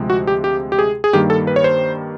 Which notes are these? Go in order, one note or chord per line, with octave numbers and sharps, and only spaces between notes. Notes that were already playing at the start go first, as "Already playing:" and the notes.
Already playing: D2 C3 F3 G#3
F#4
G4
G4
G4
G#4
G#4
G2 D#3 G3 A#3 G4
A4
B4
C#5
C5